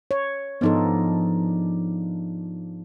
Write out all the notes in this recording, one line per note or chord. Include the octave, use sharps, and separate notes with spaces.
C#5
G#2 F3 B3 D4 D#4 A4